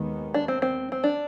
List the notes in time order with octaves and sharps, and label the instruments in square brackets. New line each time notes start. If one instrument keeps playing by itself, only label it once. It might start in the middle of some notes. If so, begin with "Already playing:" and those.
Already playing: [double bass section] D#2 D#3 G#3 B3
[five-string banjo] D4
C4
C4
C4
D4